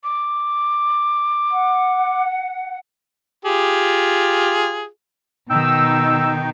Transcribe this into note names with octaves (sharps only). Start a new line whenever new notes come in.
D6
F#5
F4 G4 G#4
B2 D#3 D#4 G5 E6